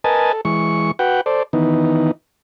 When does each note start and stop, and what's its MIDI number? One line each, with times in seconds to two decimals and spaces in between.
0.04 0.32 70
0.04 0.32 71
0.04 0.32 75
0.04 0.32 80
0.04 0.32 81
0.33 0.41 69
0.45 0.91 52
0.45 0.91 56
0.45 0.91 85
0.99 1.21 66
0.99 1.21 71
0.99 1.21 78
0.99 1.21 79
1.26 1.43 69
1.26 1.43 72
1.26 1.43 74
1.53 2.11 51
1.53 2.11 52
1.53 2.11 59
1.53 2.11 63